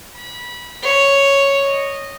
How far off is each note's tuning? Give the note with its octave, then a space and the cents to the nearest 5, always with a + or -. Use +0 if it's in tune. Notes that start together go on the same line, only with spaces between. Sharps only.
B5 -20
C#5 +0
D#5 -10